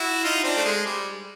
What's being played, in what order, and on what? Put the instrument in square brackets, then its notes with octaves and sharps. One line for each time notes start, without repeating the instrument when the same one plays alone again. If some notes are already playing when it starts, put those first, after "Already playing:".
Already playing: [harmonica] E4 F#4
D#4 F4
C4 D4
A3
G#3
G3